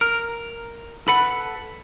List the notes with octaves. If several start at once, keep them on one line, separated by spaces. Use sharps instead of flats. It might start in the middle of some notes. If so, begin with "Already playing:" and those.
A#4 F6
A4 B4 F#5 B5